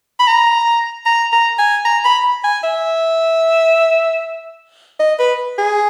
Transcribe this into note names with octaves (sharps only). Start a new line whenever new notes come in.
B5
A#5
A#5
A#5
G#5
A#5
B5
G#5
E5
D#5
B4
G#4